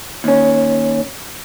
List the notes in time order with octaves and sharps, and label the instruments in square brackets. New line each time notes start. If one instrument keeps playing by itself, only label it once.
[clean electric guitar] D#2 C#4